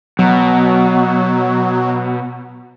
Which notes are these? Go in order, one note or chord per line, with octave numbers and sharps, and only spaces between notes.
B2 F#3